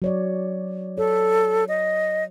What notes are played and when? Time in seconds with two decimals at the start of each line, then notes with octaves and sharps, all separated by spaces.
0.02 F#3 C#5 D5
0.98 A4 C#5
1.68 D#5